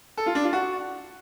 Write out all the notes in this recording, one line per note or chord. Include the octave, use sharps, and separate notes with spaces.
A4
F4
D4
F4
F#4